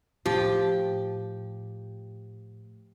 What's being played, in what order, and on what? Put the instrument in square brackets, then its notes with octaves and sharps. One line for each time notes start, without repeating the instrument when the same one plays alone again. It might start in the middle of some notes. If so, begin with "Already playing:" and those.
[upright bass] A2 [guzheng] F3 [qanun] G4